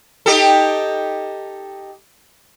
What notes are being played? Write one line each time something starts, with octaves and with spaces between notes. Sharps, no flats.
D#4 G4 A4